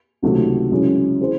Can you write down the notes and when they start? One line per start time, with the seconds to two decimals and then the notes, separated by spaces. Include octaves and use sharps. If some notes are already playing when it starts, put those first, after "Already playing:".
0.22 C#2 C3 D#3 F#3 A3
0.72 F#2 C#3 G#3 C#4 E4
1.20 E3 C4 E4 G#4 C5